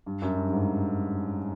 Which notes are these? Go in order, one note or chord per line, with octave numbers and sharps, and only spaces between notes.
G2
F#2
G2
G2
G#2